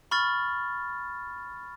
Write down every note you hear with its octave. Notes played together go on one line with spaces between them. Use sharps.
B5 C#6 F6 A6